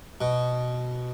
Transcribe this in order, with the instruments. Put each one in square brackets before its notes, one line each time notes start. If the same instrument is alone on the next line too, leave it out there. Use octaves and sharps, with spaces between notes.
[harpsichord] B2